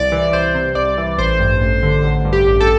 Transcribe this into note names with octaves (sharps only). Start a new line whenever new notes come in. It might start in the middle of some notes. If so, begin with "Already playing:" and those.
Already playing: C2 D5
E3
C2 C5
C3
C2 D5
E3
A1 C5
G2
A1
D3
A1
G2
G4
A1
A4